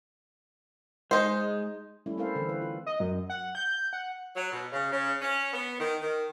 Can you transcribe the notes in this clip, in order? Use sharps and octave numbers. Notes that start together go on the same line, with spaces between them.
G#3 D#4 C5
G3 A3 C#4 E4
A#3 C4 E4 A4 C5 F5
D3 E3 C4
B4
F4
D#5
F#2
F#5
G6
F#5
F#3
B2
C#3
C#3
C#4
B3
D#3
D#3